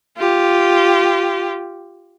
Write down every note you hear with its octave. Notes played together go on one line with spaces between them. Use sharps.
F4 G4